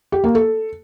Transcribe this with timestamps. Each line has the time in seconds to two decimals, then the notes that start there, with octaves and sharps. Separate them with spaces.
0.12 G4
0.24 A#3
0.35 A4